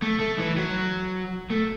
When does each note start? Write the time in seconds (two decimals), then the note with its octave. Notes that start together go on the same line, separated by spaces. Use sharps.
0.02 A3
0.20 A3
0.40 E3
0.58 F#3
1.51 A3